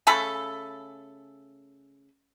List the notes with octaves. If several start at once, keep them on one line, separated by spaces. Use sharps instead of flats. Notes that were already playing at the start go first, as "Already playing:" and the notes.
C#3 A3 A4 B5